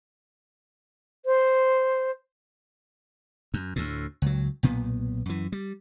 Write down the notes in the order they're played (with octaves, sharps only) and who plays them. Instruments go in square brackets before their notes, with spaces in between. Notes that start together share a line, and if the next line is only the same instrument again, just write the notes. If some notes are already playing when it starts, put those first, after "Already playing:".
[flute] C5
[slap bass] F#2
D2 A2
C#2 F#3
B1 A#2 B3
F#2 E3
G3